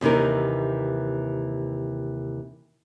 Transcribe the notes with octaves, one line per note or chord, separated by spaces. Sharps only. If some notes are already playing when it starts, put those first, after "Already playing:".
D#2 C3 E3 D#4 A#4